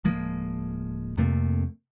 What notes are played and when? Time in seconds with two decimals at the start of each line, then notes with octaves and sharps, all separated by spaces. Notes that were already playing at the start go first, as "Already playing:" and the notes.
0.04 D1 F3 G#3 A#3
1.17 F2 C3 A3 A#3